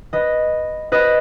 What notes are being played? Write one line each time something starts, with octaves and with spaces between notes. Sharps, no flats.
B4 D#5
B4 D#5